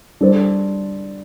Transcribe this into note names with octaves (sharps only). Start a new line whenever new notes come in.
G3 D4 A4 C5